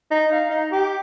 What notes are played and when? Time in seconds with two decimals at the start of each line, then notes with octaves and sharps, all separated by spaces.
0.11 D#4
0.32 F5
0.50 D#4
0.71 G4